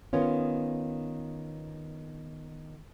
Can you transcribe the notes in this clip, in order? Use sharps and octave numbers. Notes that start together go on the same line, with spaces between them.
D#3 B3 C#4 F4